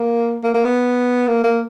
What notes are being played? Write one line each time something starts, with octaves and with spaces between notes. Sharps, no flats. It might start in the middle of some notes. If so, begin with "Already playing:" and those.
Already playing: A#3
A#3
A#3
B3
A#3
A#3